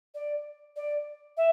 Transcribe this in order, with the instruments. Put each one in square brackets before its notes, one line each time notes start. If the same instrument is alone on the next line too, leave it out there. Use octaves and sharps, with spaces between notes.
[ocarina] D5
D5
E5